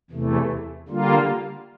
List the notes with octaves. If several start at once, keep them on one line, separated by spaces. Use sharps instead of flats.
E2 C3 E3 A3
D3 G3 A#3 F4